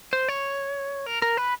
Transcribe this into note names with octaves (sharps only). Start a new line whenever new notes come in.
C5
C#5
A#4
A#4
B4